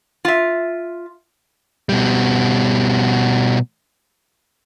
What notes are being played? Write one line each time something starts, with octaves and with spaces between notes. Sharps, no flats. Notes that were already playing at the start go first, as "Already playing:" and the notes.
F4 E5
B2 G3